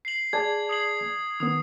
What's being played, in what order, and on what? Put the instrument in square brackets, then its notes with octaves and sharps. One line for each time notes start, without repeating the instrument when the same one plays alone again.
[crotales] C7 F#7
[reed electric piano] G#4 D5 A5 [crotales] G#6
[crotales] D#6 C7 F#7
[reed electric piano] D#3 B3 [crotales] D#6